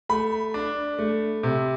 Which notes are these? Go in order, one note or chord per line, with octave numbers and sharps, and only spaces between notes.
A3 B5
D4
A3
C3